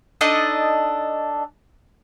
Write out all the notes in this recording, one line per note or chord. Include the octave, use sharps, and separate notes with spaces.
D4 D#4 A4 D#5